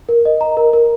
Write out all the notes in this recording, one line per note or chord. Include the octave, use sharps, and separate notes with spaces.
A#4
D#5
A#5
A#4
A#4